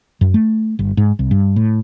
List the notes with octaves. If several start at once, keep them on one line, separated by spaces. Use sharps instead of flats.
F#2
A3
G1
G#2
C2
G2
A2